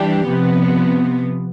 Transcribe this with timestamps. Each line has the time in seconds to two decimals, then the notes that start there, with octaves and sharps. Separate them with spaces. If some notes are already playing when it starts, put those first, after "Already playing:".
Already playing: E3 G3 D4 G4
0.27 C3 F3 B3